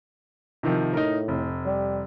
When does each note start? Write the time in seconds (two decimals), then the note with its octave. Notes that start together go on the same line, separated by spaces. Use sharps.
0.63 C3 D#3 F3
0.93 A2 D#4 A#4
1.28 F1
1.65 G3